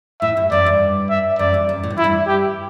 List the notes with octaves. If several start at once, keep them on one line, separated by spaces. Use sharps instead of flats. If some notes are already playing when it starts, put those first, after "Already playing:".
A2 E5
G2
F#2 D5
G2
E5
F#2 D5
G2
F#2
A2
G2
F#2 E4
G2
G4